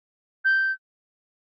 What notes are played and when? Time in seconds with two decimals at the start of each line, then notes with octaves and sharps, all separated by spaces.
0.45 G6